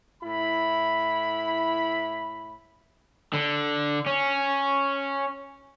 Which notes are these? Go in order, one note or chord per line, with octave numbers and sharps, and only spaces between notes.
A2 E4 B5
D3
C#4